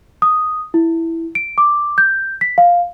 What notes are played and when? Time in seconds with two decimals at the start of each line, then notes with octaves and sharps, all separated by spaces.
0.22 D#6
0.74 E4
1.35 D7
1.58 D6
1.98 G6
2.41 B6
2.58 F5